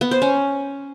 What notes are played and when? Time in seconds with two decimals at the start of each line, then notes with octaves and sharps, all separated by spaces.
0.01 B3
0.11 C5
0.22 C#4